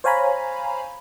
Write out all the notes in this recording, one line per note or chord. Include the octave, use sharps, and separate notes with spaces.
C5 C#5 F5 G#5 A#5 B5